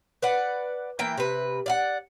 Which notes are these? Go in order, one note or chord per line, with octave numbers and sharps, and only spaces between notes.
B4 D5 F#5
E3 A#3 G5
C3 B4
D5 F5 F#5